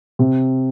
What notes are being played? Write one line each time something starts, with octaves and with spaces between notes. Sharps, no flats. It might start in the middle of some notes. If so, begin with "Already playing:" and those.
C3